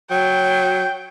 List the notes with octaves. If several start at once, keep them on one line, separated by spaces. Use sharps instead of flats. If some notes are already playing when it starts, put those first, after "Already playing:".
F#3 G5